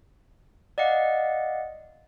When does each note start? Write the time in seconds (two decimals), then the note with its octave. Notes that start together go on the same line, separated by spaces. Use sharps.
0.78 D5 D#5 F5 F#5